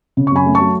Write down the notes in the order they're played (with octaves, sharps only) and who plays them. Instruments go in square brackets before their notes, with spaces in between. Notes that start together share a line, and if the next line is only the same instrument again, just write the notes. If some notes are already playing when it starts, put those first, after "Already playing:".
[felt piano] C#3
C#6
F#2 G#5 B5
A3
A5 C#6
F#3